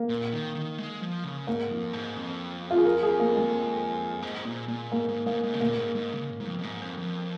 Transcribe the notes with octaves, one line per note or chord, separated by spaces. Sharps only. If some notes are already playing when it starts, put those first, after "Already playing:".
Already playing: A#3
A#2
D#3
D#3
G#3
F3
C#3
G#2 A#3
F2
G#2
F2
F4
G#4
A#4
G#4
A#3
G#3
G#2
A#2
A#2
G#2 A#3
G#2
G#2 A#3
G#2
C#3
A#2 A#3
G#2
G#2
C#3
G#2
G#2
F2
F2
G#2
F2
F2